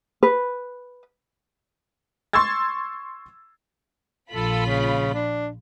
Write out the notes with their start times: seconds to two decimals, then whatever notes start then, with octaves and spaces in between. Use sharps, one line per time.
0.23 B4
2.33 C6 C#6 E6 G#6 A6
4.31 A#1 F4 A4 B5
4.66 C#3
5.14 D4